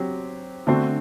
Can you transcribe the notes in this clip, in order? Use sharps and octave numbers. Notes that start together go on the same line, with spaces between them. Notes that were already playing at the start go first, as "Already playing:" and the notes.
Already playing: F#3 C4 G4
D3 A3 C4 F#4